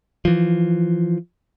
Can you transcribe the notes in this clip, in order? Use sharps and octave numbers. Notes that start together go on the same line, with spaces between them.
E3 F3